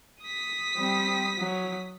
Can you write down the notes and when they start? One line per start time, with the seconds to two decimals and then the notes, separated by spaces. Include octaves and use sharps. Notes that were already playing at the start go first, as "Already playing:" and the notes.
0.22 D#6 B6
0.76 G3 C4
1.39 F#3